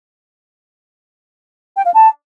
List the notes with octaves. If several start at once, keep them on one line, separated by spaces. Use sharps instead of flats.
G5
F5
A5